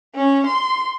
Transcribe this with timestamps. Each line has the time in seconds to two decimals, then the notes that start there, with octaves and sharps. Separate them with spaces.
0.15 C#4
0.47 C6